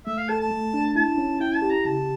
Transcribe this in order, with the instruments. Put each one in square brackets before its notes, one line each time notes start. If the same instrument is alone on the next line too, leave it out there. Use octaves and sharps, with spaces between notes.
[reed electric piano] A3 [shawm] E5
[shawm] F5
[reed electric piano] A4 [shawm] A5
[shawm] A5
[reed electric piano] A3
D4
[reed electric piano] E4 [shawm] A5
[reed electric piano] C#4
[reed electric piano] E4 [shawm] G5
[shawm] A5
[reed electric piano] G4
[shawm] A#5
[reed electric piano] C#3 [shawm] A5